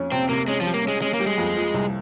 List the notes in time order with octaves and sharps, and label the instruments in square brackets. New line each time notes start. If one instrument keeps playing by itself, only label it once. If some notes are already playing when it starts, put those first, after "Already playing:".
Already playing: [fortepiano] F2 C#4
[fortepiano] C3 [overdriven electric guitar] C4
[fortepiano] C3 [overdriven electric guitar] A#3
[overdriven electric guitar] G#3 [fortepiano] C#4
[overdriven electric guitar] F3
[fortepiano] G3
[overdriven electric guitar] A#3
[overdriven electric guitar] G#3 [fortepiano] C#4
[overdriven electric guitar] G#3 [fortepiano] C#4
[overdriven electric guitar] A#3
[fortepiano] G3
[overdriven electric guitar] G#3
[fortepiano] F2
F3
C2